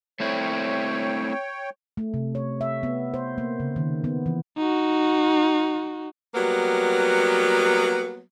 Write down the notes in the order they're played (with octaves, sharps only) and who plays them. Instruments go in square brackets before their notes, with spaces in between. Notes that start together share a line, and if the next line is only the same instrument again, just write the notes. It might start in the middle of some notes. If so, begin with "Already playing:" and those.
[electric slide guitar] A3 C4 E4 [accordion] C#5 G5
[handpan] A3
C3
C#5
E5
B3
C5
A#3
C#3
D#3
B3
E3
[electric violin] D#4 F#4
[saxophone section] F#3 G3 A#3 B3